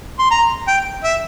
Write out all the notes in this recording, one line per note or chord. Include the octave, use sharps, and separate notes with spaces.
C6
A#5
G5
E5